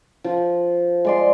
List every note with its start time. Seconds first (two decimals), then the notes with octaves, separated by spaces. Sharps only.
0.24 F3
1.05 G#3 D5 C6